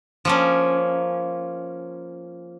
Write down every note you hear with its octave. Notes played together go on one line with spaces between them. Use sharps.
F3 A#3 C#4